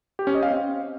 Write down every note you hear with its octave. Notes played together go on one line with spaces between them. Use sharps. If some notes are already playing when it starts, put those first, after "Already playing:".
G4
C#4
D#5
F5
C4